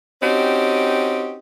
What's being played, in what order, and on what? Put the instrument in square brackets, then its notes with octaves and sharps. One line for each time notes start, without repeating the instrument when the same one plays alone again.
[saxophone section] C4 C#4 D#4 F#4 G4